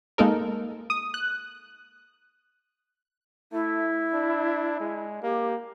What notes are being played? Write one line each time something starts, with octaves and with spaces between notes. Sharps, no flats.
G#3 A#3 D#4 A4 A#4
D#6
F#6
A3 E4
D4
G#3
A#3 G4